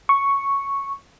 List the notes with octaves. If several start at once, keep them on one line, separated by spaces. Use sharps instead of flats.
C#6